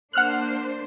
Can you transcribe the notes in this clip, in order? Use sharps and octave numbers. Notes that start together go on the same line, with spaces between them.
A#3 D4 C5 F#5 F6 F#6